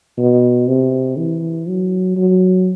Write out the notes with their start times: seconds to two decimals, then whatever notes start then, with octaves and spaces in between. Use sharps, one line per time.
0.18 B2
0.68 C3
1.17 E3
1.68 F#3
2.17 F#3